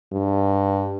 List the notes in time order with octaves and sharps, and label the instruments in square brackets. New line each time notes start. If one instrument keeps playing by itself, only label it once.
[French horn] G2